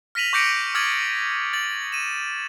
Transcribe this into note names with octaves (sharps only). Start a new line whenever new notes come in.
F6 A#6 B6 D#7 F7 F#7
C#6 D6 G6 A#6 C#7 D7
D6 D#6 F6 G#6 A6 F#7
A6 F#7
D#7 E7